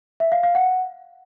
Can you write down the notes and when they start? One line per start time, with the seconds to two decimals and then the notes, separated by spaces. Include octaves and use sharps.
0.20 E5
0.32 F5
0.43 F5
0.55 F#5